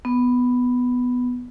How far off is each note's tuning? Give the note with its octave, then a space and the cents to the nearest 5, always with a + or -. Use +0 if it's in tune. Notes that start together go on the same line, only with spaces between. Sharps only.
B3 +5